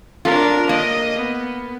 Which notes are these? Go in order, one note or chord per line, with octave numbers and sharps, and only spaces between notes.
D4 F4 A#4
A#3 D#5
B3